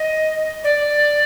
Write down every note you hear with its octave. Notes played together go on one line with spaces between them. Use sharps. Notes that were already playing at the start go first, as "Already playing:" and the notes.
Already playing: D#5
D5